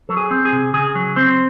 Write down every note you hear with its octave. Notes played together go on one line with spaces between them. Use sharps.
F#3 A4
G#4
C4
G#4
C3
C#3 G#4
F#3
C4 C5